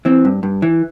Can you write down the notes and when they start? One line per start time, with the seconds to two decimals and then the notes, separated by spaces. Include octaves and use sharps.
0.05 E3 C4
0.25 G2
0.43 G2
0.62 E3